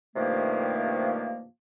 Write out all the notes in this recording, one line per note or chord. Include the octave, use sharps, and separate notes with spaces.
G2 C3 D#3 F3 A3 A#3